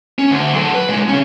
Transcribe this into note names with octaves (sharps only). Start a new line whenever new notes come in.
C#4
D2
F#3 A4
B4
A#2 G#3
C#3 C#4